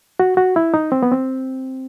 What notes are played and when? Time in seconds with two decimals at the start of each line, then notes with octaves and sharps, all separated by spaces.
0.20 F#4
0.37 F#4
0.56 E4
0.74 D#4
0.92 C4
1.03 B3
1.12 C4